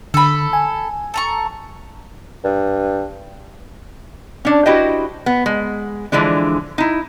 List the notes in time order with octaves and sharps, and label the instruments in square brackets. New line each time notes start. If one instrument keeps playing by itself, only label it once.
[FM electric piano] D3 [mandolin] A4 B5
[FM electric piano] G#5
[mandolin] A4 A#5 C#6
[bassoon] G2
[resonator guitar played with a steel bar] C#4 D4
E4 F#4 G4 C5 D#5
B3
G#3
D3 E3 F3 G#3 D4
D#4 E4